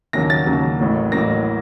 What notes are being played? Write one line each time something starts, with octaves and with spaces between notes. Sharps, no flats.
D#2 C#3 F#3 A#3 A#6
A6
D#2 C#3 F#3 A#3
A1 A2 F#3 A#3
A1 A2 F#3 A#3 A#6